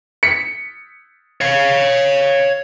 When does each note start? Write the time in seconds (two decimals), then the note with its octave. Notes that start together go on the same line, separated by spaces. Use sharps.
0.23 B6 C#7
1.41 C#5 F5